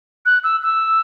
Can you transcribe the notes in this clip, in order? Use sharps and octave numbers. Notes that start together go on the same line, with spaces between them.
F#6
E6
E6